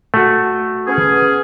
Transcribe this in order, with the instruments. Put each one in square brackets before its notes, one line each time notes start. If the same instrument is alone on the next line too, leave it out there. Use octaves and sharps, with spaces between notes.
[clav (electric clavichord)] A3 F#4
[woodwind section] B3 C#4 G#4